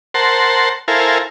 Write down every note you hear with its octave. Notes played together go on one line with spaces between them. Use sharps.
A#4 C5 F#5 A5 C6
E4 A4 A#4 C5 F5 G#5